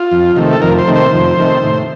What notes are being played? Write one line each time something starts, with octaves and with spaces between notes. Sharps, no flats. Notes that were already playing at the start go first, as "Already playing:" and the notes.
Already playing: F4
F2
C3 D#3 A3
A4
F2 A#4
C5
C3 D#3 A3
C5
F2
C3 D#3 A3
A2